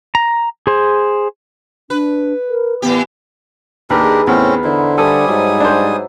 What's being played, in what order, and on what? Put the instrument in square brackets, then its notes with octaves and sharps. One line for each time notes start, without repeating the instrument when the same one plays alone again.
[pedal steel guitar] A#5
G#4 C5
[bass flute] D4 [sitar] B4
[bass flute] A#4
[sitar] A2 E3 G4 [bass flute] B3
[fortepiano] D#2 [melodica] D4 G4 A#4 [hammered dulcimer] D#4 G#4 B4
[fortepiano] E2 [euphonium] A2 [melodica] C4 C#4
[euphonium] D3 [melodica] E4 [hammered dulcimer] C5
[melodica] G3 G#5 D#6 [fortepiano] A4 [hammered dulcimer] D5 E5 F5
[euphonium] G#2 [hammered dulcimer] F#3
[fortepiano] D4 C5